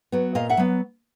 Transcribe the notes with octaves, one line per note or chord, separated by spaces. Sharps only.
F#3 B3
A#2 D#5 F5
E5 F#5
F#3 B3